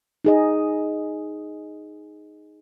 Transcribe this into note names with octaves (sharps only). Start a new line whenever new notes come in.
D#4 G#4 D#5